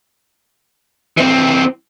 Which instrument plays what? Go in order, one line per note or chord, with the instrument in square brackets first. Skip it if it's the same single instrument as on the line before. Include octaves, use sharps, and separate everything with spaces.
[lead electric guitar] E3 C4